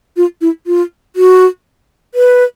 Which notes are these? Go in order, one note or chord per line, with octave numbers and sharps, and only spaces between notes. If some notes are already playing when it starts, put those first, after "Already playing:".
F4
E4
F4
F#4
B4